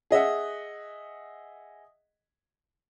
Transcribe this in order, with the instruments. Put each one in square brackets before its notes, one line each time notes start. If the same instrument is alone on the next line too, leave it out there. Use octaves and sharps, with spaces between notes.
[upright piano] G#4 D#5 E5 F#5